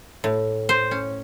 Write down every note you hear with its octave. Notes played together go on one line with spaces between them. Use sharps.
A2
C5
C#4